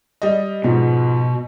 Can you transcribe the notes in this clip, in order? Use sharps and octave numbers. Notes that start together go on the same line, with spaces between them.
G3 D#5
G#2 B2 F3